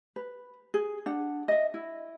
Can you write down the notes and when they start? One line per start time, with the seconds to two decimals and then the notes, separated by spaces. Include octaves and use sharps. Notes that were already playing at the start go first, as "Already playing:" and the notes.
0.16 B4
0.74 G#4
1.06 D4 F#5
1.48 D#5 E5
1.74 E4